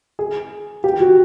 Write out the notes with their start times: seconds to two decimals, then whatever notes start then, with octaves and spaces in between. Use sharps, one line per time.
0.19 G#4
0.84 G4
1.00 F#4